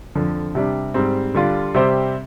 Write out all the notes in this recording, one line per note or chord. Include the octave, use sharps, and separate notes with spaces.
F2 D3 F3
C3 G3 D4
G#2 G3 C4
D3 G3 D4 F4
C3 G3 C4 G4 C5